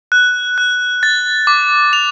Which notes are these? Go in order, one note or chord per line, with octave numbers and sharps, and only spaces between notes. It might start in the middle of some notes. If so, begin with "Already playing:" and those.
F#6
F#6
A6
D6
F7